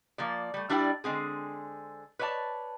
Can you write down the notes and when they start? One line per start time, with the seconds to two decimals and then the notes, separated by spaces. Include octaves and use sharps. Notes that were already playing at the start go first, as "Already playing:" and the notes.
0.18 F3 A#3 D5
0.54 G3 A3
0.69 G3 D4 E4 D5 E5 G5
1.04 D3 G#3 C4 G#4
2.19 B4 C#5 D5 E5 A5